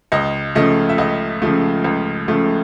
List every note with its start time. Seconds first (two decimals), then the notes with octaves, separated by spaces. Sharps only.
0.12 C#2 D#5
0.55 C#3 F3 A3 D#5
0.89 E5
0.98 C#2 D#5
1.42 C#3 F3 A3
1.84 C#2
2.28 C#3 F3 A3